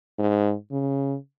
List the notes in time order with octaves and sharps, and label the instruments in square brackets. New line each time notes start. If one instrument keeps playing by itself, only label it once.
[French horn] G#2
C#3